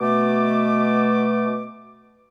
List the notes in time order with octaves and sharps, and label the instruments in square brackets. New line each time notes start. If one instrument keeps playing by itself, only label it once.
[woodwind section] B2 A3 D6